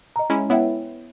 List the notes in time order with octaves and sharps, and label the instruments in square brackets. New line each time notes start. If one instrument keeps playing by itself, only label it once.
[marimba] D#5 A#5
[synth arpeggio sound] G#3 C#4 E4
[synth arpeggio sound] B3 E4 [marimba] C#5 E5 G5